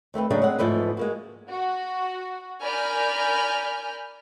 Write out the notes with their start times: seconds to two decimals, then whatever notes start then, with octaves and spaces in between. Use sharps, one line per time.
0.14 D#2 A3 C4 B4
0.30 C#3 F#3 G#3 A3 B3 D4
0.42 G#3 C4 F#5
0.58 E2 G#2 F3 A3 B4
0.97 G#3 A#3 F#4
1.49 F#4
2.61 A#4 D5 G#5 B5 F6 G6